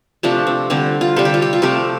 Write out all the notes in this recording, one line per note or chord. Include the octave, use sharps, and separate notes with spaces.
C3 F3 A3 D4
C4
D3 G3 C4
F4
C3 G3 A4
G4
F4
G4
F4
C3 F3 A3 G4